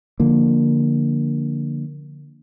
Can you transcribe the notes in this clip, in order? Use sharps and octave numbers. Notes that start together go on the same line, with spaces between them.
D3 F3 A#3